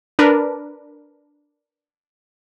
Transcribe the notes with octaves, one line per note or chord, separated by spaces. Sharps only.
D4 A#4 B4